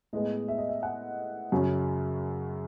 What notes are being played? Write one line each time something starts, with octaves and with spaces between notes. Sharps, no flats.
A2 G#3 B3 D#5
E5
D#5
E5
F#5
F#2 C#3 F#3 C#4